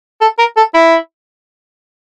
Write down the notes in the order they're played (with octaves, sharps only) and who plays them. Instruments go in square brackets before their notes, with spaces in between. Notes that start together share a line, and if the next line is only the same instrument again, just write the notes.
[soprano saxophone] A4
A#4
A4
E4